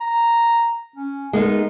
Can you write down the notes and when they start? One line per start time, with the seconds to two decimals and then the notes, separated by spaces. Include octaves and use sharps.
0.01 A#5
0.96 C#4
1.33 G#3 B3 D#4 A#4